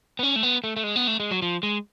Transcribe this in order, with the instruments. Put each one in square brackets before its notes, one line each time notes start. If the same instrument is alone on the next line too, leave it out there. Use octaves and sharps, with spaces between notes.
[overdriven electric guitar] B3
C#4
A3
B3
A3
A3
G#3
B3
A3
G#3
F#3
F3
G#3